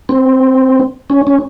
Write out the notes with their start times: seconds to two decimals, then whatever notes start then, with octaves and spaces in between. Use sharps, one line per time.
0.09 C4
1.10 C#4
1.27 C#4